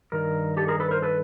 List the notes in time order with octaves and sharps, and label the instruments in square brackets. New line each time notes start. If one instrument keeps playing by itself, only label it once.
[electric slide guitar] G2 D#3 A#4
G4 A4
G#4 A#4
A4 B4
A#4 C5
A4 B4